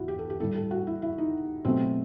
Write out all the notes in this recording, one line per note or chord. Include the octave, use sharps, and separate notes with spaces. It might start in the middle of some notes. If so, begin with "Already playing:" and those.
Already playing: E2 E4 F#4
G4
A4
G4
A2 G3 A4
A4
F#4
E4
E4
D#4
B2 F#3 A3 C4